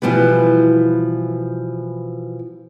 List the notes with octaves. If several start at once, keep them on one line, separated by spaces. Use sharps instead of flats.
B2 E3 F3 G3 B3